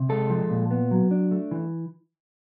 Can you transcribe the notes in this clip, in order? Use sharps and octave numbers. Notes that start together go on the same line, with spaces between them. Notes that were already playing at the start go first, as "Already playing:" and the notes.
Already playing: C3
G#3 A4
F3
A#2
B3
F#3
D4
A3
E3